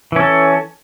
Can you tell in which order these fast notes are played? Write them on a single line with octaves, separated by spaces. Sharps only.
E3 C#4 A4